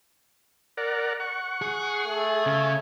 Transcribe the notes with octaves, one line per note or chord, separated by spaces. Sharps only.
A#4 D5 F#5
F#5 C#6
G#4
A3
C#3 G#5